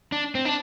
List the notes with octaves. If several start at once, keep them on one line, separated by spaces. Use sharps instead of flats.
D4
C4
D4